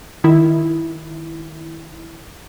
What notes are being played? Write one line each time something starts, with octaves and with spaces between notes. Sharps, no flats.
D#3 E4